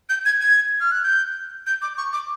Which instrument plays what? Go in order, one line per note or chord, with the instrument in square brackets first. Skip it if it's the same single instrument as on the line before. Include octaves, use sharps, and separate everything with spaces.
[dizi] G6
G#6
G#6
F6
F#6
G6
G6
D6
C#6
D6